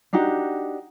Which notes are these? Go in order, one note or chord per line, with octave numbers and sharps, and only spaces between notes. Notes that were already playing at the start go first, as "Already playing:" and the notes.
D4 D#4 F#4 G4